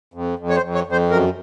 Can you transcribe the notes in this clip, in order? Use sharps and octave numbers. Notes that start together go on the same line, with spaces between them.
F2
F2
C#5
C5
F2
C#5
F2
C5
F#2 A#4